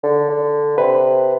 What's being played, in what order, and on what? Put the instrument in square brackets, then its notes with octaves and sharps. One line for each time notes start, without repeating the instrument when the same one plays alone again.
[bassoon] D3
D3
[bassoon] C3 [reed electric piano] B4